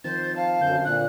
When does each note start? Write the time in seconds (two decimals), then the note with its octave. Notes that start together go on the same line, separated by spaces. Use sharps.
0.04 D#3 F3 C4 C5 A6
0.36 F5 A5
0.61 F#2 D3 C4 G6
0.84 A#2 F#6